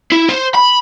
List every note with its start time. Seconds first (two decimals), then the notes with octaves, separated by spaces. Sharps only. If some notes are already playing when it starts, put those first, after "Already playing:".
0.12 E4
0.29 C5
0.55 B5